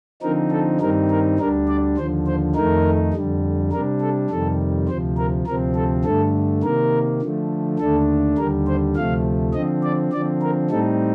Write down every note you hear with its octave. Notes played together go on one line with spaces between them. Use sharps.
D3 F3 C4 D#4 A#4
A4
G2 D#3 G3 C4 D#4 A#4
A#4
D2 D3 G3 D4 A#4
D5
D#2 D3 F3 C5
C5
F2 D#3 A3 D#4 A#4
F2 D3 G3
C3 G3 D4 A#4
A4
F2 C3 D#3 G3 A4
D2 C3 F3 C5
A#4
D2 C3 F3 C4 A#4
A4
G2 D3 A3 A4
C3 D#3 A#3 A#4
D3 F3 A3
D#2 D3 A3 D4 A4
D#2 D3 G3 A#4
C5
D2 C3 F3 A3 F5
D3 F3 C4 D#5
D5
D3 F3 C4 D5
A#4
A2 G3 C4 D#4 A4